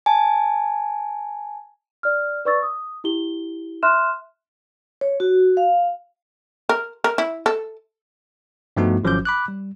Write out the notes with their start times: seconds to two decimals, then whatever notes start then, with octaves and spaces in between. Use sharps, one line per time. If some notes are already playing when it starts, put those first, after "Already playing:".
0.06 G#5 A5
2.03 D5 F6
2.45 B4 D5 C#6 E6 A6
2.63 D#6
3.04 E4 G4 G7
3.83 E5 C6 F6 F#6 E7
5.01 C#5
5.20 F#4
5.57 F5
6.69 A#4
7.04 A#4
7.18 E4
7.46 A4
8.77 G2 F3 A3 B3 D#4 F#4
9.03 G#1 F3 F#3 C#4 D6 G6
9.25 B5 D6 F#6
9.48 G3